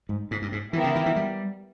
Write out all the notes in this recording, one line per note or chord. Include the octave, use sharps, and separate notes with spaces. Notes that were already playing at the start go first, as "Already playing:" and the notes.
G#2
G#2
G2
G#2
E3 B3 E4 G4 A#4 E5
C#3
D#3
E3
G3